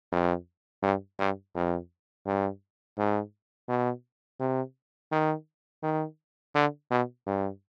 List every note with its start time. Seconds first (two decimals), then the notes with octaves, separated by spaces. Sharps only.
0.12 F2
0.83 G2
1.19 G2
1.55 F2
2.26 G2
2.98 G#2
3.68 B2
4.40 C3
5.12 D#3
5.83 D#3
6.55 D3
6.91 B2
7.27 G2